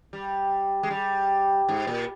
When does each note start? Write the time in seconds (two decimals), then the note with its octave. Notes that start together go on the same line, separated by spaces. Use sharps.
0.13 G3
0.83 G#3
0.90 G3
1.69 G#2
1.87 A#2